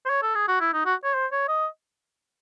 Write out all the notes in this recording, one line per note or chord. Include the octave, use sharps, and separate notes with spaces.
C5
C#5
A4
G#4
F#4
E4
D#4
F#4
C#5
C5
C#5
D#5